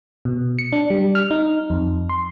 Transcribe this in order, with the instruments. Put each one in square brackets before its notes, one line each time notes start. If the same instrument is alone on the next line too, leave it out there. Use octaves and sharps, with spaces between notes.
[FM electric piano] B2
C#7
D4
G3
F6
D#4
F2
C6